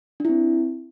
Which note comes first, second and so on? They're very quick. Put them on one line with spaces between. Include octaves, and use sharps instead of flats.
D4 E4 C4